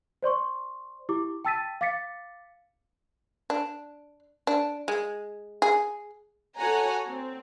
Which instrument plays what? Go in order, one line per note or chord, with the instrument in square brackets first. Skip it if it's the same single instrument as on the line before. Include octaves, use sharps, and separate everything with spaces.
[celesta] C5 D5 C6 C#6
E4 G4 D6
G5 A5 E6 A6 B6 D#7
F5 D6 A6 B6 C#7
[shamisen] D4
D4
G#3
G#4
[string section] F#4 A4 C#5 F#5 G#5 A#5
C4